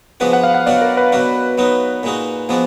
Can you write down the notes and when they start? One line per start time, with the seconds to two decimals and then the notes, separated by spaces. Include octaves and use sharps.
0.20 F3 G#3 B3 D4 F#4 B4
0.33 F#5
0.44 F5
0.54 F#5
0.66 B2 F#3 D4 F#4 D5
0.82 A#4
0.97 B4
1.12 B2 F#3 D4 F#4
1.58 F#3 B3 D#4 F#4
2.03 A#2 G#3 D#4 F#4
2.49 F3 G#3 B3 D4 F#4